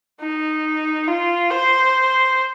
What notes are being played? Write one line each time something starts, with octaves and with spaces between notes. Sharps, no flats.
D#4
F4
C5